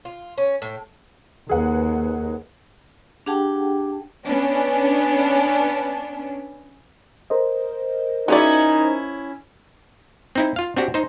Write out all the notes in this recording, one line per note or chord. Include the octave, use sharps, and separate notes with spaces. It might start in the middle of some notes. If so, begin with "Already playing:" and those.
F4
C#4
A2
D#2 G#4 B4 F#5
D4 G4 G#4 F#5 G5 A5
B3 C#4 D4
A#4 C5 D#5
C#4 D#4 E4 F#4 G#4 D5
C4 D#4 E4
F4 F5
C4 D4 F#4 G4
D#4 C5